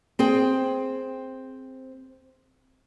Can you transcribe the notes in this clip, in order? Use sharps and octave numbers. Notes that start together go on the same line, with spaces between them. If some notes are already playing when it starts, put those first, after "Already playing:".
C4 G#4 G5